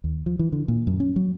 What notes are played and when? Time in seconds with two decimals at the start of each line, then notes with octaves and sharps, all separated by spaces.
0.04 D#2
0.26 F3
0.39 E3
0.52 D3
0.68 A#2
0.87 F#2
1.00 C#4
1.16 F#3